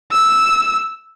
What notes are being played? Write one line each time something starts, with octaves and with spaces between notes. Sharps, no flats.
E6